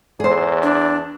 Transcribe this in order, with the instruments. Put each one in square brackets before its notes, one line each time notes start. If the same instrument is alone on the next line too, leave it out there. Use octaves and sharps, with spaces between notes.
[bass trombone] E2 [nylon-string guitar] G#4 C5
[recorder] D4